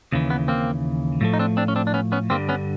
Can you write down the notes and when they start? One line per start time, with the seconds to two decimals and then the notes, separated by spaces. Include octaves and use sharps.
0.12 D#2 C#3 E3
0.30 B3
0.48 A#3 C4
1.21 A2 F3 A3
1.34 D#4
1.39 C4 D4
1.57 C4 D4
1.68 C#4
1.76 C4 D4
1.87 D4
1.94 B3 C#4
2.12 B3 C#4
2.30 G2 D3 G3 A#3 C4
2.49 B3 C#4